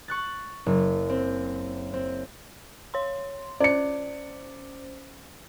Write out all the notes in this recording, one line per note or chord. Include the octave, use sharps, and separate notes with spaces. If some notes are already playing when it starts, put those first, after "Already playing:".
C#6 F#6 A6
F#1
C4
C4
C#5 C6
C#4 C5 D5 C#7